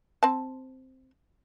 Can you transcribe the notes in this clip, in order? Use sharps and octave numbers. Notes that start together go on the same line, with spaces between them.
C4 A5